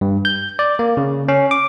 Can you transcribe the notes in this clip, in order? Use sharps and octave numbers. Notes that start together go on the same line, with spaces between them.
G2
G6
D5
A#3
C#3
C#4
D6